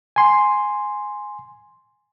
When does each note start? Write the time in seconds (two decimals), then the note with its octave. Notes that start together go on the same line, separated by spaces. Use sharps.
0.16 G#5 C6